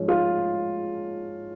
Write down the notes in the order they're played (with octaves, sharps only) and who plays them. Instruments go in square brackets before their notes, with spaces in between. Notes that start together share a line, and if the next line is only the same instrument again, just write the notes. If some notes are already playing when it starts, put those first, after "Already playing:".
Already playing: [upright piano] G#2 F3 C#4
F4